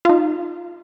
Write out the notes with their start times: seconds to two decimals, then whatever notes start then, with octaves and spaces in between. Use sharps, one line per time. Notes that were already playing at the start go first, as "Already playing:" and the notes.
0.05 D#4 F4